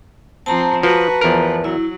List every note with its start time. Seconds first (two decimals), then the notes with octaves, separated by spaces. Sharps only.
0.46 F3 C4 A5 A#5
0.83 F3 F#4 B4
1.21 E2 F3 A#4
1.64 F#3 E4